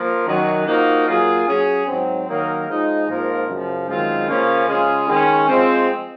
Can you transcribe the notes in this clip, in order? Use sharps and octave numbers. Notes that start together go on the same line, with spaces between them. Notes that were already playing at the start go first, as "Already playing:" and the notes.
Already playing: F3 A#3 A#4
F#2 D#3 F#3 C#4
F3 A#3 D#4 F#4 A#4
F#3 A#3 F4 G#4
F#3 C#4 G#4
G#2 F#3 C4
D#3 F#3 A#3 D#4 A#4
F3 G#3 D#4
G#2 F3 A#3 F4 A#4
F#2 C#3 F3
F#2 D#3 G#3 C4 F4
C#3 F3 A#3 C#4
C#3 G#3 C#4 F4 G#4
D#3 G#3 C#4
F3 G#3 C4